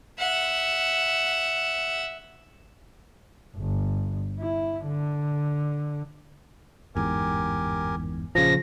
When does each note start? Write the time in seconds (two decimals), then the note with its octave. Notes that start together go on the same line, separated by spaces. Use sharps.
0.19 E5 F#5
3.56 G1
4.40 E4
4.86 D3
6.95 G1 E2 G#2 G4 A#4 G#5
8.35 A#1 C#3 F3 C#5 A#6